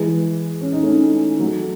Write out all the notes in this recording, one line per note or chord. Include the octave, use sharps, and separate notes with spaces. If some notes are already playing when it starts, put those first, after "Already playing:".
Already playing: E3 G#3
C#4
D#4
A3 C#4
F#3 A3